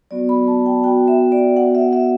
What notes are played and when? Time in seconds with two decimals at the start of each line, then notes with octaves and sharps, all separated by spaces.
0.11 F#3 B3 F#4 D5
0.29 B5
0.48 A5
0.66 G5
0.83 B3 F#4 G5
1.08 E5
1.32 D5
1.56 B3 F#4 F#5
1.75 E5
1.93 E5